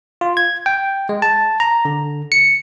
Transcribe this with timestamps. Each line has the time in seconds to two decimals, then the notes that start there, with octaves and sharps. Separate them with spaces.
0.21 F4
0.37 G#6
0.66 G5
1.09 G#3
1.22 A5
1.60 A#5
1.85 D3
2.32 C#7